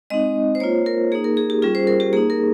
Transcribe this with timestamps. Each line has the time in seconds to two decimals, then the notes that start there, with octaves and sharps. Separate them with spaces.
0.10 G#3 C4 D#4 D#5
0.55 C5
0.60 A#3 F4 C#5
0.86 A#4
1.12 A#3 D#4 G#4
1.24 A#4
1.37 G#4
1.50 G4
1.62 G3 C#4 F4 G#4
1.75 C5
1.87 A#4
2.00 G4
2.13 A#3 G#4
2.17 D#4
2.30 A#4